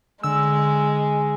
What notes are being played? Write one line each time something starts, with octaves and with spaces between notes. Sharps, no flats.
D3 G#3 E6